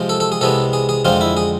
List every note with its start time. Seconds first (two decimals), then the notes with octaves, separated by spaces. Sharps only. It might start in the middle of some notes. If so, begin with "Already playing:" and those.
Already playing: C3 F3 G#3 C4
0.09 A4
0.20 A4
0.32 G#4
0.41 C2 C3 G#3 B3 A4
0.73 G#4
0.89 G#4
1.05 F2 D3 G#3 C4 F4
1.21 E4
1.37 G#4